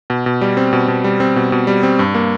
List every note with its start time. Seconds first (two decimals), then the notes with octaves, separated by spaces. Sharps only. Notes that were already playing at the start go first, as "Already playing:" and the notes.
0.10 B2
0.26 B2
0.41 G3
0.57 C4
0.73 B2
0.88 B2
1.04 G3
1.20 C4
1.36 B2
1.52 B2
1.67 G3
1.83 C4
1.99 G2
2.14 A#3